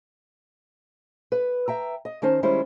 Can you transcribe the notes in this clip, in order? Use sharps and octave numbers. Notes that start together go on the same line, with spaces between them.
B4
E5 G5 A#5
D#5
D#3 C#4 D#4 C5 A5
D#3 G3 G#3 C#4 E4 C5